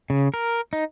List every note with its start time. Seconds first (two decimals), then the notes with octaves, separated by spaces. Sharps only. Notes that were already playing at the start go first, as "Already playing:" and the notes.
0.10 C#3
0.34 A#4
0.73 D#4